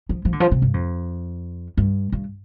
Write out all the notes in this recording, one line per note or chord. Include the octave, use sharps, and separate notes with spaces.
F3
F3
D3
F3
C3
G2
F2
G2
G2